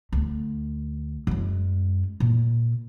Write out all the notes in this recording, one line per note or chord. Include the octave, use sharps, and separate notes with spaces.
D2
F#2 G#3
A#2